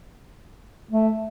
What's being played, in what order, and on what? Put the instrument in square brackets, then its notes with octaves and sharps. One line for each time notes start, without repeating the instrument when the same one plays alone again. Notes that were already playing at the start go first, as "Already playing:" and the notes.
[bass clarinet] A3